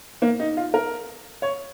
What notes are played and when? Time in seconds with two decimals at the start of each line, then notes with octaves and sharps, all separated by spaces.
0.22 A#3
0.40 D#4
0.57 F4
0.74 A#4
1.42 C#5